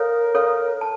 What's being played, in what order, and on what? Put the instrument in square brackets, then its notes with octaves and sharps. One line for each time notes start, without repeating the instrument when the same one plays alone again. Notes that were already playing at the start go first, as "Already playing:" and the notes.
Already playing: [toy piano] A4 C#5 F5 [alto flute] A#4
[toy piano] A4 C#5 F5
A5